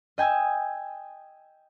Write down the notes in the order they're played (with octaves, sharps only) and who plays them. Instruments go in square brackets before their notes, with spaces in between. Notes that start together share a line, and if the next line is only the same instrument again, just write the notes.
[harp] D#5 G5 G#5 D#6 E6